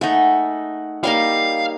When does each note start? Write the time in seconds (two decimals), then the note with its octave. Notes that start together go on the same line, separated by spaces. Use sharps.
0.01 A3 D#4 G#4 F#5 C#6
1.04 G3 A#3 D#4 C#5 F5